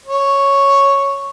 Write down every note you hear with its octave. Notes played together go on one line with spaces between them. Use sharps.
C#5